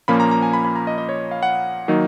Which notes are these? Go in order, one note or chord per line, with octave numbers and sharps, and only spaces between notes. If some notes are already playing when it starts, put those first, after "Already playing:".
A#2 F3 A#3 C#4 B5
A#5
A#5
G#5
B5
B5
A#5
D#5
D#5
C#5
F5
F#5
D#3 F#3 A#3 D#4